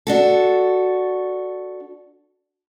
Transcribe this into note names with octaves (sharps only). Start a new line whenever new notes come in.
D4 F#4 A4